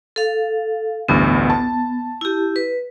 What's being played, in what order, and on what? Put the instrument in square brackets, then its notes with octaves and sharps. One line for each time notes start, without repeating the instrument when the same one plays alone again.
[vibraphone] A4 F5
[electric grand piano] A1 D2 G2 [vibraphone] B3
[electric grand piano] A5
[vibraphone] E4 G4
B4